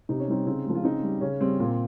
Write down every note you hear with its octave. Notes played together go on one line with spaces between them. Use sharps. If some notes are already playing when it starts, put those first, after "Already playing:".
C3 D#4
C#4
G3 C4 D#4
C#3 C4 D#4
F3 G#3
F4
C#3 C4 D#4
G3
C#3 C#4
G3 C4
A#2